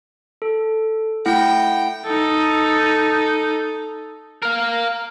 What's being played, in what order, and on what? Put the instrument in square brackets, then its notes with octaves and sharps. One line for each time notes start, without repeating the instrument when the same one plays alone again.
[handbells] A4
[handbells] A3 E4 F#5 [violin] G5
[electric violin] D#4 A4
[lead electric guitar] A#4 F5